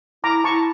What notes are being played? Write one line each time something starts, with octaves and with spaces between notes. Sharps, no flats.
E4 A#5 D6
E4 A5 C#6